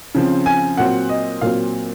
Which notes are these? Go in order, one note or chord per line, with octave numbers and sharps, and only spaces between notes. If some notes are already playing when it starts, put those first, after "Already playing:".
C#3 F3 C4
G#5
A#2 F#3 C4 F#5
D#5
A#2 F#3 C4 F5